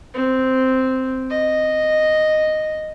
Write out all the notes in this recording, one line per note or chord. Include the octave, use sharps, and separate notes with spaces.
C4
D#5